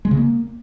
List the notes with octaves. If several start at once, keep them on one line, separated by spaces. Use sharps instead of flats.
G#3
C#3
A#3